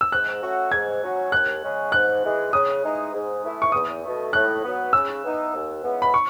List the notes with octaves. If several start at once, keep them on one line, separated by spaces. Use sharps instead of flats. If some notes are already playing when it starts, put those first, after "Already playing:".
E6
G#2 F#6
F#3 A3 C#4 F#4
G#2 G#6
F#3 C#4 F#4
D#2 F#6
C#3 G#3 C#4
G#2 F#6
E3 G#3
C#3 D#6
E3 G#3 D#4
G#2
E3 A3 E4
C#6
E2 D#6
B2 A3
A2 F#6
F#3 B3
C#3 E6
E3 B3 D#4
D#2
C#3 E3 G#3 B3
B5
C#6